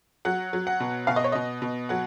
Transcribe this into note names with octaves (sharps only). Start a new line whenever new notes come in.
F#3 F#5
F#3
F#5
B2
B2 F5
D#5
C#5
B2 D#5
B2
F#3 F#5